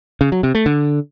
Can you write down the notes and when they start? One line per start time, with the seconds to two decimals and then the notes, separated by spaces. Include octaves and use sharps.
0.21 C#3
0.32 F#3
0.43 C3
0.55 A3
0.66 D3